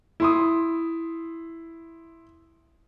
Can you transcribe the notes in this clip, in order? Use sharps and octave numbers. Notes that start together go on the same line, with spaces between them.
E4 C6 D#6